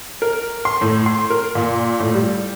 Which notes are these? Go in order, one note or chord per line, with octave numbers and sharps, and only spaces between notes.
A#4
C6
A2
C6
A#4
A#2
A2
G3